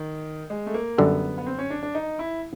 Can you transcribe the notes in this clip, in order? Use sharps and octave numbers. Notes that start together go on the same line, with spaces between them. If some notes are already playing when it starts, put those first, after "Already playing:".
Already playing: D#3
G#3
A3
A#3
F#2 D3 G3 B3
B3
C4
C#4
D4
D4
D#4
E4